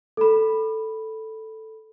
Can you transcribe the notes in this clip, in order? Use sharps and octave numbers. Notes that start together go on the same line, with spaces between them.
A4 B5